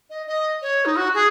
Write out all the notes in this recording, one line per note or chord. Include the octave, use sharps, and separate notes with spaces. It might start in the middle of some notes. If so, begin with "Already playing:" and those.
D#5
D#5
C#5
D#4
F#4
G#4